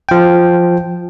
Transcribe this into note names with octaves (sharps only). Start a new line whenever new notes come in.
F3 G5